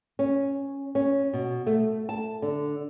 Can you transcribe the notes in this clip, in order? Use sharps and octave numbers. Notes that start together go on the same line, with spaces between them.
C#4
C#4
B2
A3
A5
D3